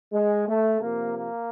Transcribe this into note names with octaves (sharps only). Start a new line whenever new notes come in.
G#3
A3
C3 F3 A#3
A#3